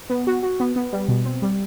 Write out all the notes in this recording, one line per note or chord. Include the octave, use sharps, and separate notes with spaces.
B3
F#4
F#4
B3
B3
G3
B2
C4
G3